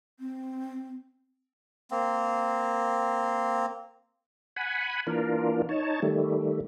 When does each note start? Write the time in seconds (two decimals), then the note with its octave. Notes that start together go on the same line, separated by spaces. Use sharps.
0.20 C4
1.91 A#3 C4
4.56 F#5 G#5 B5
5.07 E3 A#3 D4 F4 A#4
5.69 D#4 C#5 A5
6.02 D#3 G3 A3